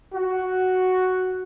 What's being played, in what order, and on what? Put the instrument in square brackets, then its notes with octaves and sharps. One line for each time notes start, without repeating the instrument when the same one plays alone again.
[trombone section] F#4